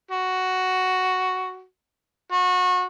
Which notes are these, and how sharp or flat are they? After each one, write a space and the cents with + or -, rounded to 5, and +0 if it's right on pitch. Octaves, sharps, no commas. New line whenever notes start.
F#4 +5
F#4 -25